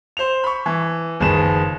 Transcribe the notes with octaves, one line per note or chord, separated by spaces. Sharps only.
C5 F7
B5 C#6
E3
F#1 D#3 F3 G#4 B4 E7